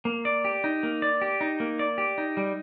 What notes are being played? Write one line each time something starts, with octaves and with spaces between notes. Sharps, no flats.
A#3
D5
G4
D#4
A#3
D5
G4
D#4
A#3
D5
G4
D#4
G3